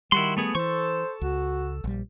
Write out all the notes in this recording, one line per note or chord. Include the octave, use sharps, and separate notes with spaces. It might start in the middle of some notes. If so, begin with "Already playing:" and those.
D#3 G3 E4 F#4 C6
A3 B3 G#4
E3 A4 C5 C#6
C#2 F#4
A#1 G3